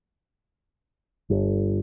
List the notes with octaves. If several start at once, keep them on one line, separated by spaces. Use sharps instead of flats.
G1